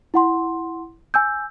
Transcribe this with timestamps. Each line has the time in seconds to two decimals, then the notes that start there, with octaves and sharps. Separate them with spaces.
0.14 E4 F#5 C6
1.14 G#5 E6 G6